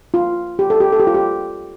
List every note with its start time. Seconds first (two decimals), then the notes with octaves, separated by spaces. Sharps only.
0.14 F4
0.59 G4
0.70 A4
0.80 G4
0.93 A4
1.00 G4
1.07 F4
1.14 G4